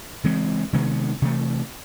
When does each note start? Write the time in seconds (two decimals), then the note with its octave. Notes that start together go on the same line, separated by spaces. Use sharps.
0.24 C#3 E3 G#3 C4
0.73 C3 D#3 G#3 B3
1.22 C3 E3 A3